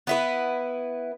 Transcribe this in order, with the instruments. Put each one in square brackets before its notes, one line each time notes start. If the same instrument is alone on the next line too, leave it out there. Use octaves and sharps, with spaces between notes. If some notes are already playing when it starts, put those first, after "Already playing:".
[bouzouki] B3 E4 B4